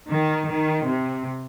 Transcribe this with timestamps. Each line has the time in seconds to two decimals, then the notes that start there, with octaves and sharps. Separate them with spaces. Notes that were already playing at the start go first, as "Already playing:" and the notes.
0.10 D#3
0.50 D#3
0.89 C3